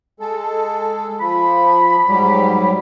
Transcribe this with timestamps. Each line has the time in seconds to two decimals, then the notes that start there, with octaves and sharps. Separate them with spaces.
0.20 G#3 A4
1.20 F3 B5
2.07 G#2 F#3 G3